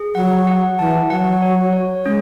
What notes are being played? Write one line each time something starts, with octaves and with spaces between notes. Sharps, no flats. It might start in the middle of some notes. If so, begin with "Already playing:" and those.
Already playing: G#4
F#3 F#5
F#5
E3 A5
F#3 F#5
C#5
C#5
G#3 C#4